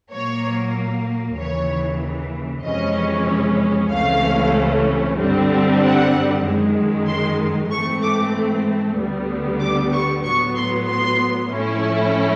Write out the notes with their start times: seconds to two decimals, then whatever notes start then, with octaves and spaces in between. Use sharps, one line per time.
0.11 A#2 F#3 A#3 C#5
1.37 D#2 C#3 E3 C#5
2.64 F2 C3 E3 G#3 C#4 D#5
3.90 C#2 C3 E3 A3 C#4 F5
5.17 G2 D3 G3 C4
5.81 F#5
6.44 F#2 D#3 G#3
7.07 C6
7.71 G#2 E3 A3 C4 C#6
8.02 D6
8.97 D2 D3 G3 B3
9.60 D6
9.92 C#6
10.23 A2 F#3 B3 C#6
10.55 C6
10.87 C6
11.51 A2 F3 A3 C#4 E4